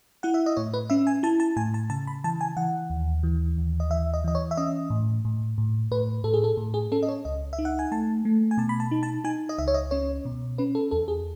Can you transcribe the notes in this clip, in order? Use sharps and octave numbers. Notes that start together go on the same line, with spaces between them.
E4 F#5
E5
D#5
A2 C#5
B4
C#4 E5
G#5
E4 A5
A5
A2 G#5
A5
C#3 A5
B5
E3 A5
G#5
E3 F#5
D#2
E3
D#2
D#5
E3 E5
D#5
E3 D#5
C#5
E5
C#4 D#5
A2
A2
A2
A2 B4
A2 A4
G#4
A4
A2
G#4
C#4 A4
D#5
C#5
C#2 D#5
E5
D#4
F#5
G#5
A3 A5
A3
G#5
B2 A5
B5
A5
D#4
A5
D#4 G#5
D#5
C#2 E5
C#5
D#5
C#4 C#5
B2
C#4 B4
A4
E2 A4
G#4